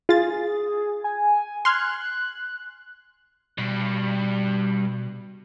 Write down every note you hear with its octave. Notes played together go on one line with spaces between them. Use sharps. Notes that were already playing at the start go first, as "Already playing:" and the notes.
F4 G#4 A6
G#5
C6 F6 F#6 G#6
G2 B2